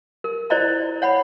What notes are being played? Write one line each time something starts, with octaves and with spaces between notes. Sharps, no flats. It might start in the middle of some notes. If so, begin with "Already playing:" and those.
A#4
E4 C5 D5 D#5 A#5
C#5 F#5 B5